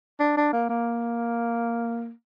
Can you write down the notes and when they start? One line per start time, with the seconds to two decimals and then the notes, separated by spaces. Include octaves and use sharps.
0.20 D4
0.37 D4
0.53 A#3
0.69 A#3